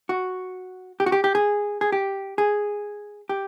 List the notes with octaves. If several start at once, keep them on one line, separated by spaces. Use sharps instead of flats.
F#4
G4
F#4
G4
G4
G#4
G#4
G4
G#4
G4